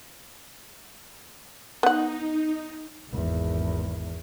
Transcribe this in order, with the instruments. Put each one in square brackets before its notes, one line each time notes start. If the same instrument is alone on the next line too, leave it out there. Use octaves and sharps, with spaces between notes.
[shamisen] B3 F#5 [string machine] D#4
[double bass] G#1 E2